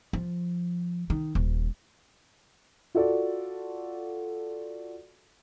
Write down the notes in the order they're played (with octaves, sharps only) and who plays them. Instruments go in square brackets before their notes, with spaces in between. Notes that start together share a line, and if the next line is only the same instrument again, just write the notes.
[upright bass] F3
D#3
D#1
[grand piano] F4 F#4 A4 D5